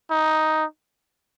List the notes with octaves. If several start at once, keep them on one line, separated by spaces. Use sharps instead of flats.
D#4